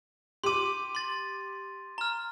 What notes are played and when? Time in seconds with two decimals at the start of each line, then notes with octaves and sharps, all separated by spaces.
0.44 G4 C6 D6 D#7
0.95 C6 A6
1.98 A#5 F6